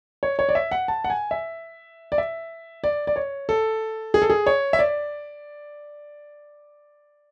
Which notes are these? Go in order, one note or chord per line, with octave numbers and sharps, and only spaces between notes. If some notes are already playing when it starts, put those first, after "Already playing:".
C#5
C#5
D5
E5
F#5
A5
F#5
G#5
E5
D5
E5
D5
D5
C#5
A4
G#4
A4
G#4
C#5
E5
D5